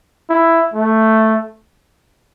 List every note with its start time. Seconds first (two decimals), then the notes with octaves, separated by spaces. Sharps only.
0.30 E4
0.74 A3